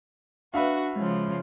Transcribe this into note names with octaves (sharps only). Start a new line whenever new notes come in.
D4 F#4 B4 E5 F5
C#3 F3 G#3